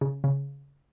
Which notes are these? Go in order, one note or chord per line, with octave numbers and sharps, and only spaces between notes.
C#3
C#3